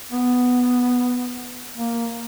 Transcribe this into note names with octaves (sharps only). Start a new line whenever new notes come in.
B3
A#3